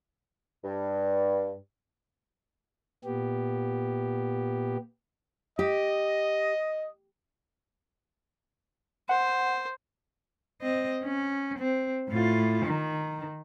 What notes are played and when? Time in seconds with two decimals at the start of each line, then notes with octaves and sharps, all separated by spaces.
0.65 G2
3.05 A#2 B3 G4
5.59 G4 D#5
9.09 C5 F#5
10.62 C4 D#5
11.04 C#4
11.59 C4
12.09 A2 F4
12.66 D#3